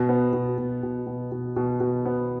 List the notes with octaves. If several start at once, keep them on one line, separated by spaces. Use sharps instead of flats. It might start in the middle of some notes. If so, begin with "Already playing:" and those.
Already playing: B2
B3
B2
B2
B2
B2
B2
B2
B2
B3